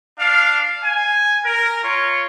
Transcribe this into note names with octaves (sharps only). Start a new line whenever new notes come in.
D4 F5
G#5
A#4
F4 C#5